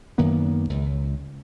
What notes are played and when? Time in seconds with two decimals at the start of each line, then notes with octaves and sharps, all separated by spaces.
0.18 F#2 D#3 A#3 B3
0.70 C#2